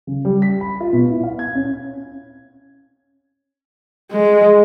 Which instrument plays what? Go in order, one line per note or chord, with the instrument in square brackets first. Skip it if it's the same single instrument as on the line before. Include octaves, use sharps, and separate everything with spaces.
[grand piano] C#3
G3
B6
B5
F4
B2
E4
F5
G#6
C#4
[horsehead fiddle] G#3